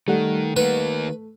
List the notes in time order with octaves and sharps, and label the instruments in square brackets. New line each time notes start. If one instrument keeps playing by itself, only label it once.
[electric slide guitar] D#3 [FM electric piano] G3 F#5 [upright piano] A3
[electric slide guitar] D#3 A#3 [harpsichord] B4